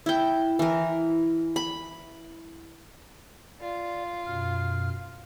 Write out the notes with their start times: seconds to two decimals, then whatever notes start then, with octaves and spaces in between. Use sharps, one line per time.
0.06 E4 G5
0.59 E3 A#4
1.56 B5
3.61 F4 D5
4.26 F#2 B2 F6